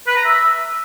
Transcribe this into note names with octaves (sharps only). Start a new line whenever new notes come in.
B4
A#5
E5